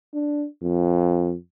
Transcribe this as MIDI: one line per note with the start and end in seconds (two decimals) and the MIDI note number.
0.14 0.46 62
0.62 1.34 41